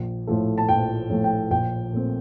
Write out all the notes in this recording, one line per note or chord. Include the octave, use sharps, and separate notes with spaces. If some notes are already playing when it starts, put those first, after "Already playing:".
Already playing: A#1
A2 F3 A3
A5
A#1 G5
A2 F3 A3
G5
A#1 G5
A#2 A3 C4